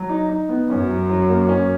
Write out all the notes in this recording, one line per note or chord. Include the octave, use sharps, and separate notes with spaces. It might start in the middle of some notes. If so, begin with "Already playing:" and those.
Already playing: F#3
D#4
D#4
B3
F#2 C#4
F#3
F#3
A#3
C#4